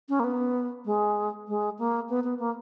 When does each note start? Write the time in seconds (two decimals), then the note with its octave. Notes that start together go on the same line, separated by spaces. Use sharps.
0.09 C#4
0.20 A#3
0.24 B3
0.85 G#3
1.48 G#3
1.79 A#3
2.09 B3
2.24 B3
2.39 A#3